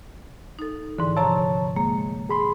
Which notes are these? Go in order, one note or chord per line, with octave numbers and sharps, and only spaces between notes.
D#4 A4
G#2 D3 E3
C3 F3 C#5 A5 A#5
G#3 A#3
G#4 B5 C6